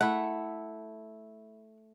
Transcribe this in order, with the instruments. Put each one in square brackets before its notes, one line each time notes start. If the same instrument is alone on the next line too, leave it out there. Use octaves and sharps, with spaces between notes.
[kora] A3 E4 [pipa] F#5